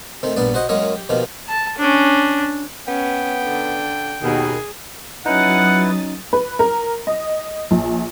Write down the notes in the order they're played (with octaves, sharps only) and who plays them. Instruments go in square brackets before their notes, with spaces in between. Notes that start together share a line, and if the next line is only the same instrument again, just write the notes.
[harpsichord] D#3 A3 C4
A#1 G2 B3 D5
F#4 C5 D#5 F#5
F#2 F#3 G#3 A#3 C#5 D#5
G4
B2 D#3 F3 A#3 G4
[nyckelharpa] A5
C#4 D4
[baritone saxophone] B3 [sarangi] C#4 [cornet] G5
[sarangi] D3
[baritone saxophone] D#2 [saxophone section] B2 D#3 [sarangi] G#4
[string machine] F#3 D#6 A6 [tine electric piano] C#4 D#4 [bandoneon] E4 B4 [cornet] F#5
[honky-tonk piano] B4
A#4
D#5
A#1